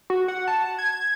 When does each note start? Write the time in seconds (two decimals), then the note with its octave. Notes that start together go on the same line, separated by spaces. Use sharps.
0.10 F#4
0.28 F#5
0.48 A5
0.79 G#6